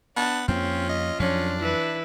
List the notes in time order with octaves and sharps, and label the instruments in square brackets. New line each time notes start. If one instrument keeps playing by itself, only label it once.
[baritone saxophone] B3 [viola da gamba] D4 [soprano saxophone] A5
[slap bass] F2 A#3 [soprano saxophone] C4 [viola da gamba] C#4 [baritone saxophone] F4
[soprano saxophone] D#5
[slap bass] F2 F3 F#3 [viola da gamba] C#4 [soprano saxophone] D4
[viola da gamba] E3 E4 B4